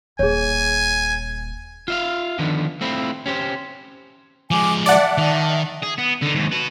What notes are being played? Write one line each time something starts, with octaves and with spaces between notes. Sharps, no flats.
D#1 G#4 C#5 G#5
F4 E5 F5
D3 D#3 F3 B3 D4
A3 C4 E4 F4
C#4 G4 C5
F3 G#3 G#5 D6
D5 E5 F#5 A5
D#3
G#4
B3
D3 D#4
D#2 G#2
F#4 B4